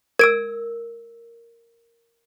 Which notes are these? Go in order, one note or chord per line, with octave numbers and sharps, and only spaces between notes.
A#4 E6 G#6 D7